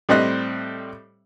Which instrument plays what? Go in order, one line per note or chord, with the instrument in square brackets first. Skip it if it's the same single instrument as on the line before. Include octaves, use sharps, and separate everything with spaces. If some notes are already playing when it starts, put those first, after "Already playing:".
[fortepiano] A2 G3 C4 D#5 F#6